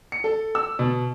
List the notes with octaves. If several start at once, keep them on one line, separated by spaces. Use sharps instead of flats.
C#7
A4
E6
B2